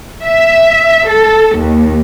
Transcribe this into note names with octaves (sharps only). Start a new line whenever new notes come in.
E5
A4
D#2